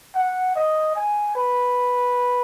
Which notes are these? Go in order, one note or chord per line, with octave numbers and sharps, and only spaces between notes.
F#5
D#5
G#5
B4